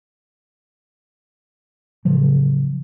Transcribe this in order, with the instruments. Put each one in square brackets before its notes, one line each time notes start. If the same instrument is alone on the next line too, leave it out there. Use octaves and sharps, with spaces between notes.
[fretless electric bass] A2 C#3 F3 F#3